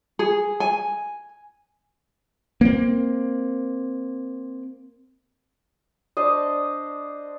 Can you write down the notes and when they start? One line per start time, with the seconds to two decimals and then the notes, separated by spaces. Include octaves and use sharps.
0.19 G#4
0.60 G#5
2.61 A#3 C4
6.17 D4 C5 D#5